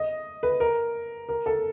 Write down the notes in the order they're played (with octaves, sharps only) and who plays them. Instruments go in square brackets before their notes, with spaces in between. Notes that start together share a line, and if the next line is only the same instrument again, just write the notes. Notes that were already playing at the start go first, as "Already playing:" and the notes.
Already playing: [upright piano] D#5
B4
A#4
A#4
A4